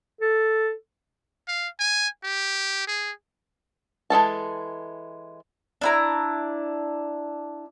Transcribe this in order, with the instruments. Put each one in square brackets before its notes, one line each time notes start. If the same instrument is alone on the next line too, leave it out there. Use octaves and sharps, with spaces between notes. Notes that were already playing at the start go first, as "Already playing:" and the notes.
[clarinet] A4
[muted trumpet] F5
G#5
G4
G#4
[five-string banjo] E3 G#3 A4 A5
[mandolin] D4 E4 A#5